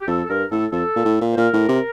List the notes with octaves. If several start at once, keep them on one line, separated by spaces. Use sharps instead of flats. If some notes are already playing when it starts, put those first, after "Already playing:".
G4
F2 A4
A4
G2 A#4
A2 A4
F2 A4
A#2
A2
A#2
C5
A#2 A#4
A2
C3